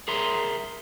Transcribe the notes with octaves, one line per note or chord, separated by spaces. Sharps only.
G#4 A#4 E5 A#5 C6